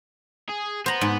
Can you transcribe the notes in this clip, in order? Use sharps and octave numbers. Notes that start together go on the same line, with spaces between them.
G#4
B3 C5 A#5
G#2